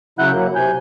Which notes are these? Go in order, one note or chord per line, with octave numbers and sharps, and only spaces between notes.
C#3 F#3 E4 F#5 F#6 G6
F#2 A#3
C3 G#5 G6